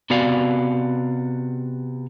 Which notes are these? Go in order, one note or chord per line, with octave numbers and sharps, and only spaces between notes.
C3 B3 F#4 D5 F5